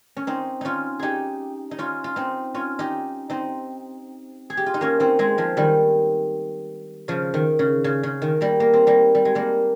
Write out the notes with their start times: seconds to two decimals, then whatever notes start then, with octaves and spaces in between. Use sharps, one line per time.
0.17 C#4
0.27 C4 D#4
0.61 C#4 D#4 F4
0.99 D#4 G4 G#4
1.71 D#4
1.79 C#4 F4
2.04 F4
2.16 C4 D#4
2.54 C#4 F4
2.79 D#4 G4
3.30 C4 D#4
4.50 G#4
4.57 G4
4.66 F4
4.74 D#4
4.81 A#3 C#4
5.00 C4 D#4
5.19 G#3 C4
5.38 F3 G#3
5.57 D#3 G3
7.08 C#3 F3
7.34 D#3
7.59 C#3
7.84 C#3
8.03 C#3
8.22 D#3
8.41 G3 A#3
8.60 A#3
8.73 C4
8.87 G3 A#3
9.15 G3
9.25 G#3
9.35 G3 A#3